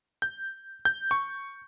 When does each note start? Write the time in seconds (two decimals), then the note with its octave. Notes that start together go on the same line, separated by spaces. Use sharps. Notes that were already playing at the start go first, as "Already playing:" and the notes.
0.22 G6
0.85 G6
1.11 C#6